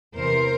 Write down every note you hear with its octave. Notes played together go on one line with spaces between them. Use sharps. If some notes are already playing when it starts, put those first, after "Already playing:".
E2 C3 E3 A#4 C5